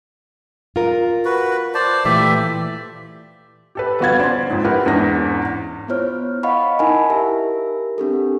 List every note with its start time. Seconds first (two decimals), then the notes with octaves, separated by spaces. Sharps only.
0.76 F4 A#4
1.25 F#4 B4
1.74 C5 D5 A5
2.05 A#2 E3 A3 G4 D5 E5
3.75 G4 A4 B4
4.00 G1 B3 F#4 F5 G#6 A6
4.19 C#4 C5 D5 C6
4.50 F2 G#2
4.64 E4 G4 A#4 B4 F#5
4.86 E2 G#2 C#4 D4 A#6
5.88 B3 E4 F4 C5 C#5 F6
6.43 D#5 F5 F#5 B5 C#6
6.79 D#4 E4 A#4 F#5 G#5 B5
7.10 G4 A#4 E5
7.98 C4 D4 G4 A4